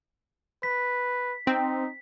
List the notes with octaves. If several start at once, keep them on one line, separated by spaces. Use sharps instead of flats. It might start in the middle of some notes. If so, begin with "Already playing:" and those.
B4 B6
C4 D#4